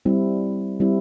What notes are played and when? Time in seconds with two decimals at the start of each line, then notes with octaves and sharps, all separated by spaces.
0.05 G3 C4 E4
0.80 G3 C4 E4